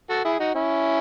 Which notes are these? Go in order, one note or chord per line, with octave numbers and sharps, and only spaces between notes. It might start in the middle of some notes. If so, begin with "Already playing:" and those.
F#4 A4
E4 G#4
D#4 F#4
C#4 E4